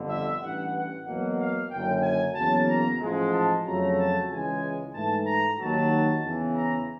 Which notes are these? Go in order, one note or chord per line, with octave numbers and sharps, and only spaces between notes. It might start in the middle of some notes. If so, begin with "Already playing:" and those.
Already playing: G1 F2 D3
E5
A1 G2 E3 F#5
F#5
E2 B2 F#3 A#3 F#5
F5
F#1 F#2 D3 F#3 G5
G#5
E2 C#3 F#3 A#3 A5
A#5
A1 G#2 F3 G#3
A5
F2 C#3 F#3 A3 A#5
A5
C#2 C#3 E3 G#3 G#5
G#2 E3 A3 A5
A#5
D#2 D#3 F#3 A5
E2 C#3 E3
A#5